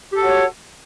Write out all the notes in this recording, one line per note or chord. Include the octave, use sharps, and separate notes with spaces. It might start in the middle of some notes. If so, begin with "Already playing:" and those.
F#4 G4 A4 C#5